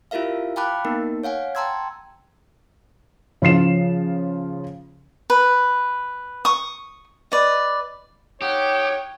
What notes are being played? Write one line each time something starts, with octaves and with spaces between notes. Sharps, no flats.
E4 F4 G4 A#4 E5 F5
F5 G5 A5 B5 D6 F#6
A#3 B3 D#4 A#4
C#5 F5 F#5 G#5
G5 A5 A#5 C6 E6 G#6
C#3 F3 F4 C7 E7
B4
C#6 D#6
B4 D5 D#5
D#4 G4 C#5 F#5 G5